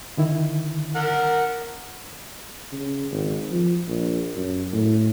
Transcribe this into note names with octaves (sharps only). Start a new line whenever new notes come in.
D3 D#3 E4
A#4 F#5
C#3
G#1
F3
A#1
F#2
A2